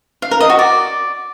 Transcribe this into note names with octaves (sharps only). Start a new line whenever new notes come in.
F5
A#4
D#5
F#4
D5